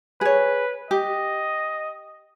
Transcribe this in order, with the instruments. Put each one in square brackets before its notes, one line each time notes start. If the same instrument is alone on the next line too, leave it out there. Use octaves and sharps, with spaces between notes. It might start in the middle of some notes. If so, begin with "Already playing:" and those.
[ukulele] G#4 C#5 [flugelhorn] B4
[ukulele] G4 [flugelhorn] D#5